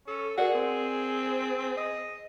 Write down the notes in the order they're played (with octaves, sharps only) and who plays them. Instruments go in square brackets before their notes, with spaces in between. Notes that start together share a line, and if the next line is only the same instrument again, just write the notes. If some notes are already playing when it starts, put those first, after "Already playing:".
[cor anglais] C#4 [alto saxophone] A4
[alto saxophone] F#4 [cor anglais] G#4 [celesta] A#4 D5 F#5
[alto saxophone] C4
D#5